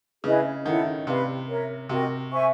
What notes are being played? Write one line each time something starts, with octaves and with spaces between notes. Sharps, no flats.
C#3 E4 G#4 B4 D#5
D#3 E4 A4 C#5 F#5
C3 G4 B4 D5 F5
A#4 C#5 E5
C3 F#4 A#4 D#5 G5
C5 E5 G#5 C#6